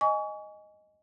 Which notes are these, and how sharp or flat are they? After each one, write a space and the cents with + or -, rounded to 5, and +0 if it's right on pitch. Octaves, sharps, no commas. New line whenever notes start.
D#5 +0 G#5 +0 C#6 +35